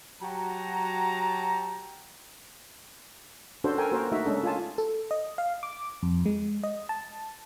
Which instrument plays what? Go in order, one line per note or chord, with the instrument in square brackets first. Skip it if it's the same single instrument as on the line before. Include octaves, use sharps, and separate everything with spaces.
[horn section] F#3 F#4 G4 A5 A#5
[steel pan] C#4 D4 F#4 A4 C5
A4 A#4 G5 G#5
A#3 F#4 A#4 C5
A3 D#4 F#4 E5
G#3 C#4 D4 A4
F4 G#5 A5
[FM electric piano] A4
D#5
F5
D6
F2
G#3
D#5
A5